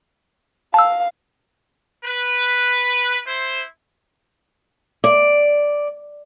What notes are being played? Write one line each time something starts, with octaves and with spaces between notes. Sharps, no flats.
F5 A5 E6
B4
E4 C5
D5